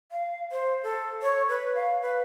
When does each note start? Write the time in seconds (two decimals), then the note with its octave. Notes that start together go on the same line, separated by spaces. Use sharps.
0.12 F5
0.52 C5
0.83 A4
1.22 C#5
1.49 B4
1.75 F5
2.01 B4